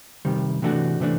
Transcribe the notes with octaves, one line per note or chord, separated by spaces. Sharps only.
C3 D#3 G3
C3 E3 A3 D4 F#4
C3 E3 A3 D4